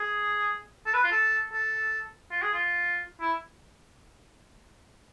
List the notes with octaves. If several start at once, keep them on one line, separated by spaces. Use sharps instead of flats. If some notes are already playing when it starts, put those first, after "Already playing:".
Already playing: G#4
A4
B4
F4
A4
A4
F4
G#4
F4
E4